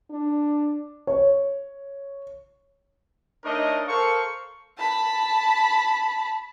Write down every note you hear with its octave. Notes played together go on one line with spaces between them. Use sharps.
D4
C#5
A3 D4 D#4 A#4 C#5 D#5
A4 A#4 C5 F5 C#6
A5 B5